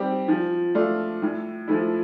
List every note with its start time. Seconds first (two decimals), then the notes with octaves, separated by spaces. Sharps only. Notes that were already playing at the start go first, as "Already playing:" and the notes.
Already playing: G3 C4 G4
0.28 F3
0.75 A3 D4 F4
1.22 A2
1.68 F3 A3 E4